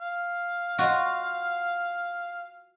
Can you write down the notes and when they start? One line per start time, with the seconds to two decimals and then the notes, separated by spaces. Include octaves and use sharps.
0.01 F5
0.78 F4 F#4